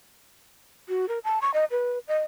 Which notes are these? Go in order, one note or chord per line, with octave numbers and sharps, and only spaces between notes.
F#4
A#4
A5
C#6
D#5
B4
D#5